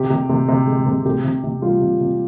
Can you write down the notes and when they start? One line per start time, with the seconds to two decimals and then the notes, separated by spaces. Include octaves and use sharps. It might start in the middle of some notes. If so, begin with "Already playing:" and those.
Already playing: C3 G4
0.10 C3
0.29 C3
0.48 C3
0.67 G#3
0.86 C3
1.05 C3 G4
1.24 C3
1.44 C3
1.62 G3 F4
1.81 C3
2.00 C3